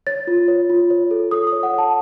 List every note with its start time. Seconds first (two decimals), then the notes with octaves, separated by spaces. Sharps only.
0.07 C#5 A6
0.27 F4
0.48 C#5
0.70 F4
0.90 C#5
1.11 A4
1.31 A4 D#6
1.47 D#6
1.52 C#5
1.63 F#5
1.73 C#5
1.78 A5